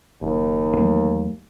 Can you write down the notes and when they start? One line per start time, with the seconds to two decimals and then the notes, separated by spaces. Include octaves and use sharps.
0.21 F#1 D#2
0.77 E2 F#3 A3